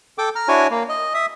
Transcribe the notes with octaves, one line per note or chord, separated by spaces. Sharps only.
A4 G5 D6
A#5 F6
D4 E4 F#4 C#5 G#5
A#3
D#5
E5 D#6